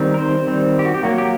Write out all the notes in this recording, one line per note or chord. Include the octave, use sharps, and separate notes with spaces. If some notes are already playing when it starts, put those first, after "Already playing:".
Already playing: D#3 G3 C4
A#4
C5
D#3 G3 C4
G4
F#4
G4
F#3 A#3 F#4
G4